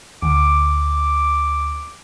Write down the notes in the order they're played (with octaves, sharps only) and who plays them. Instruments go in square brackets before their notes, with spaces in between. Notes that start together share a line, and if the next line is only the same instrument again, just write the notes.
[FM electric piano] D2 [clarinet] D6